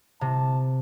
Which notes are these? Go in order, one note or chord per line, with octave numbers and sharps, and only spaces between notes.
C3 A5